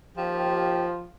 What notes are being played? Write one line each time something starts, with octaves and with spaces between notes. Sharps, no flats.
D#2 F3 F4 G4